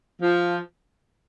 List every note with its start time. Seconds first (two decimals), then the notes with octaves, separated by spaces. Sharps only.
0.21 F3